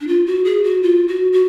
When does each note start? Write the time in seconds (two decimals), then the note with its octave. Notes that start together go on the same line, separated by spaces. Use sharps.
0.01 D4
0.07 F4
0.26 F#4
0.45 G#4
0.64 F#4
0.83 F4
1.08 F#4
1.33 F#4